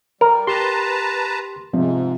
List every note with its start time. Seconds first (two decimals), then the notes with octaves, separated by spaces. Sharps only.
0.21 G3 A#4
0.47 G4 B4 A5 A#5 C6
1.73 G#2 C3 F3